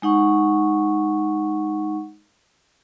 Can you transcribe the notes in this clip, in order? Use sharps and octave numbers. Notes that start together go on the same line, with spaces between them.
G#3 D#4 F#5 C#6